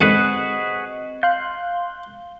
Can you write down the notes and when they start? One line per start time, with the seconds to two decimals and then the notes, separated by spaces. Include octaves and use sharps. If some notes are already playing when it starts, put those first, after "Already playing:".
0.01 D#2 G#2 D3 C4 F#4 G#4 B4 D#5
1.23 F5 C6 F#6 G6